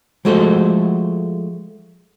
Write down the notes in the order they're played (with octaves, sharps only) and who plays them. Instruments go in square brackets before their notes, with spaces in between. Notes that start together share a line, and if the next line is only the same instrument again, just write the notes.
[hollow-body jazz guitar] F3 G#3 A3 F#4 A4 C5